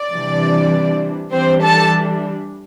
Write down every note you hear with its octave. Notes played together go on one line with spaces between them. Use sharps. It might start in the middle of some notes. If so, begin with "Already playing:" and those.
Already playing: D5
C3 E3 G3 D4
E3 G3 C4 D4 C5
A4 A5